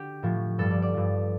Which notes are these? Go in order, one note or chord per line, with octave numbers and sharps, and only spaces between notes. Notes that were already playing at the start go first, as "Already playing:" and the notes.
Already playing: D3 G4
A2 F3
G2 G3 A4
D5
D5
G2 F3